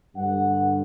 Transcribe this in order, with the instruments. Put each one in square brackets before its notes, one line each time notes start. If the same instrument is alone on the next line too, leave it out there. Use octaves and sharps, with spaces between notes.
[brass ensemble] G2 D3 G3 F#5